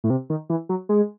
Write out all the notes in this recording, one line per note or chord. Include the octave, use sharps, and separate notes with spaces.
A2
C3
D#3
E3
F#3
G#3